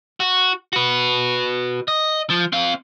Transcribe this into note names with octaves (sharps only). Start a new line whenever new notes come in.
F#4
F#4 B4
D#5
F3
C4 F5